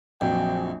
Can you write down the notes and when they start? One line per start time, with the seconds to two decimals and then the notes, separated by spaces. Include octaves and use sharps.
0.21 A#1 F2 F#3 G5